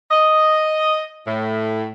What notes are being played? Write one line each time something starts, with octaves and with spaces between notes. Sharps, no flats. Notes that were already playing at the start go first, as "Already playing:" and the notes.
D#5
A2